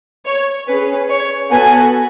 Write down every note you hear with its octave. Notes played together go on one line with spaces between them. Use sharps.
C#5
C#4 G#4 B4
C#5
B3 F#4 A4 G#5